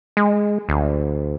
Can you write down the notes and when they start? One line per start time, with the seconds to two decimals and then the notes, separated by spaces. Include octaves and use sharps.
0.17 G#3
0.69 D2